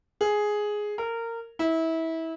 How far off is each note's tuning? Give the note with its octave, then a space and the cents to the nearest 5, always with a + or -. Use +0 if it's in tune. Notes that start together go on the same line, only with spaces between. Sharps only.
G#4 +5
A#4 -20
E4 -25